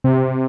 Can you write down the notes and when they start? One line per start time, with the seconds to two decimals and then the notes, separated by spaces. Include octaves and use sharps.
0.04 C3